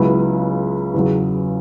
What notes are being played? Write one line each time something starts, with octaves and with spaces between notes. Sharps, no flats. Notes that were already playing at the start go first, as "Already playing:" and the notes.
Already playing: C#2 C#3 F#3 B3 E4
E2 C#3 F#3